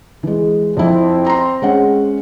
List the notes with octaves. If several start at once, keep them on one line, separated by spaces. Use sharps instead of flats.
E3 G#3
F2 C4 E4
A#5 C6
G#3 C#4 F#5